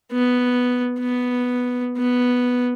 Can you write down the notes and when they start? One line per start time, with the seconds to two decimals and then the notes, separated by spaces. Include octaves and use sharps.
0.12 B3
0.99 B3
1.97 B3